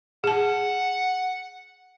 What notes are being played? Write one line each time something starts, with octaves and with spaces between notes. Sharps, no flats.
G#4 F#5 A5